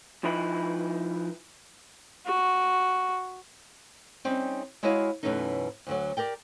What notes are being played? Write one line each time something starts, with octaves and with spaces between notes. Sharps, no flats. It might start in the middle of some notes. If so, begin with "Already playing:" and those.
F3 D#4 E4 B4
F#4
G3 C4 C#4 D#4
G#3 E4 F#4 C#5 D#5 F5
F#2 B2 E3 A3 C#4 D#4
D2 D3 F#3
G4 A#4 D5 G5